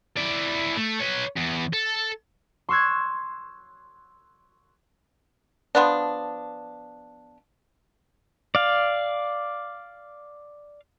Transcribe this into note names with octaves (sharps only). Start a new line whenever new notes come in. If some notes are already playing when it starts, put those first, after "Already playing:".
E4 D5
A3
B4 C#5
E2
A4
C6 C#6 E6 F#6 G#6
F3 B3 D4
D5 F5